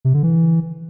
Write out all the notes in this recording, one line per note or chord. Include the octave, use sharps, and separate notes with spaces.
C3
D3
E3